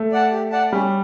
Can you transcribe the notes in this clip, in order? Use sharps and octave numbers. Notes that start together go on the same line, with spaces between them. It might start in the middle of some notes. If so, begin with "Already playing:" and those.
Already playing: A3
D5 F#5 A5
G4
D5 F#5 A5
G3 C#4